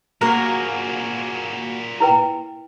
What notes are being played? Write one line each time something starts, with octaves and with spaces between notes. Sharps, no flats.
A#2 A#3 F#4 G#4 A#4
E4 B4 G5